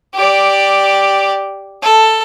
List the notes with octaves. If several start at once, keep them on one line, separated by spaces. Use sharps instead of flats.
G4 D5
A4